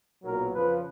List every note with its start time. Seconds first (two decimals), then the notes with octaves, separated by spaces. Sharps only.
0.22 B1 A#2 F#3 B3 A#4
0.52 F2 C#3 F3 B4